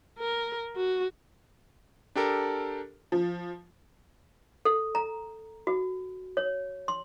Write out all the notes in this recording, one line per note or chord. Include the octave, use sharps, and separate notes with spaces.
A#4
F#4
D4 G4 A4 A#4
F3
A4
A#5
F#4
C#5
C6